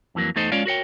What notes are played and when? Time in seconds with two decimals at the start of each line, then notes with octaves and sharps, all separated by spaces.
0.15 F2 E3 F#3 A#3
0.36 E2 A3 D#4 A4 C5 D#5
0.52 G#3 C#4 F4 C#5 D5 F5
0.66 F#4 A#4 C#5 G5